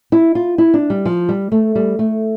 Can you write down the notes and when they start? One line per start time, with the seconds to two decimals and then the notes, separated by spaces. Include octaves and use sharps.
0.12 E4
0.35 F4
0.58 E4
0.74 D4
0.90 G3
1.05 F3
1.29 G3
1.52 A3
1.75 G3
1.99 A3